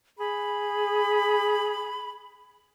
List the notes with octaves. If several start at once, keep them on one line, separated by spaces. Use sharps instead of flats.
G#4 B5